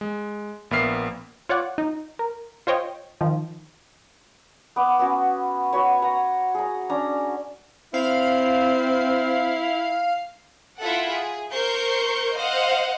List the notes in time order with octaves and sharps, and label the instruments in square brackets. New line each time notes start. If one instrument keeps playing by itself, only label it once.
[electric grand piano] G#3
A#1 A#3 B3 E5 F6 C7
[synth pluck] F4 C#5 D5 F#5
D#4
A#4
F4 C5 C#5 D#5 G5
D#3 F3
[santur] B3 D6
B3 C#4 F#4
F#4 B4 C#5
F#5 A#5
G#4 A#5
C#4 D4 A#5
[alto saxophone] C4 [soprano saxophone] E4 [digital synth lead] F5
[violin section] E4 F4 A4 E5 F#5
G#4
A#4 C5 C#6 G6 C7
C5 D#5 F5 F#5